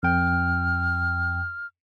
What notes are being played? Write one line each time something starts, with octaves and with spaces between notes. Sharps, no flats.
F2 G5 F6